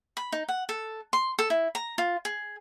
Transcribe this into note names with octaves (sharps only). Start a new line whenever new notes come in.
B5
D#4
F#5
A4
C6
A4
E4
A#5
F4
G#4